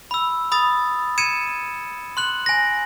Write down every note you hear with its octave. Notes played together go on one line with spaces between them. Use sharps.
B5 E6
B5 D#6 A6
G#6 C#7 D#7 E7
C6 F#6 F#7
G#5 A#6